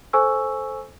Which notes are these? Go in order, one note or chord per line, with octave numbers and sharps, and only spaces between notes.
A4 C5 G#5 C#6 E6